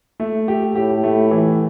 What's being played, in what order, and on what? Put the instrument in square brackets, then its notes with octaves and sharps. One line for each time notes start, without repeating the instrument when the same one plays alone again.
[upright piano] A3
G4
[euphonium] A2 [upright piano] G4
[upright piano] A3
E3